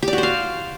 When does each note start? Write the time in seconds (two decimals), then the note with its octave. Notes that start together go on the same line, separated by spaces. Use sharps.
0.03 G4
0.08 D5
0.13 F#4
0.18 C5
0.23 F5